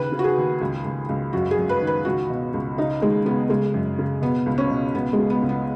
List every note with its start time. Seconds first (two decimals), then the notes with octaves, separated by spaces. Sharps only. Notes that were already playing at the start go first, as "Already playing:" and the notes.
Already playing: D#2 C#3 B4
0.12 C#3
0.19 F#4
0.24 G#4
0.37 D#2
0.61 C#2
0.85 C#2
1.09 C#2
1.33 F#2 F#4
1.51 G#4
1.57 F#2
1.69 B4
1.81 D#3
1.87 B4
2.05 C#2 F#4
2.30 B2
2.54 C#2
2.78 C#3 D#4
3.01 D#2 G#3
3.25 C#3 B3
3.49 C#3 G#3
3.74 F#2
3.99 C#3
4.22 B2 B3
4.46 C#2
4.58 C#4
4.71 B2
4.94 C#2 B3
5.13 G#3
5.19 C#3
5.30 B3
5.42 C#2
5.49 B3